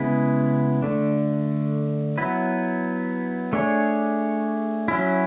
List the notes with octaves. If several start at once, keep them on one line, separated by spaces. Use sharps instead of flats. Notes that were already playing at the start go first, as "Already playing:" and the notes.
Already playing: C#3 G#3 B3 E4 B4
D3 A3 D4
F#3 B3 E4 B4
A3 D4 G#4 C#5
F#3 C#4 E4